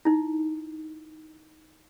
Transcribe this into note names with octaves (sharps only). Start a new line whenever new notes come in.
D#4 E4